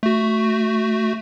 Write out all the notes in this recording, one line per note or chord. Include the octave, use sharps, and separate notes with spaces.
A3 F#4